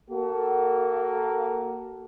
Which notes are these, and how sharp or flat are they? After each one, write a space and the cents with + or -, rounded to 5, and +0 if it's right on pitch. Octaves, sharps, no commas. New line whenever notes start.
A#3 +0 F#4 +30 A4 +0